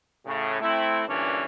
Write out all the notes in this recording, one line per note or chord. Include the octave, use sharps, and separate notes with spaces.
A2 C#3
A3 C4 E4
G2 A#2 D3 E3 C#4 D4